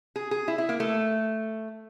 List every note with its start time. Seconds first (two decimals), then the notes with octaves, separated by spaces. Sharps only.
0.16 G#4
0.31 G#4
0.48 E4
0.58 E4
0.69 A#3
0.80 A3